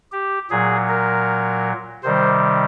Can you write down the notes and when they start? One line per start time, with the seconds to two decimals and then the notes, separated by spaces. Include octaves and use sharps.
0.12 G4
0.50 A#2 F#3 G#4
0.89 A#4
2.03 C3 D#3 G3 C5